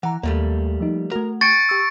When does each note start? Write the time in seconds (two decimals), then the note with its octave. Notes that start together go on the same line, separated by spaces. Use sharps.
0.03 E3 F#5 A#5
0.23 D#2 G3 A3 A#3
0.80 F3 D#4
1.11 A3 F#4 A#4
1.41 G5 C#6 A6 C#7 D7
1.69 G4 E6